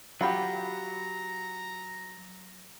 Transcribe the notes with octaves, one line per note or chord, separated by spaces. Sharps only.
F#3 F4 G4 F#5 A#5 B5 D6